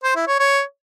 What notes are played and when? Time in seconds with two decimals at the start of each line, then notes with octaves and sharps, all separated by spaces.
0.04 C5
0.16 E4
0.27 C#5
0.39 C#5